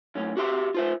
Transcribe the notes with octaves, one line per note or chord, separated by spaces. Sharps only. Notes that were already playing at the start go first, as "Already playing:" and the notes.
F#2 A2 C#4
F#4 G4 E5 C6
F4 C5 E5